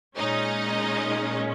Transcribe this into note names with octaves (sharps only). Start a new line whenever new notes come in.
A#2 G#3 C#4 D#4 D#5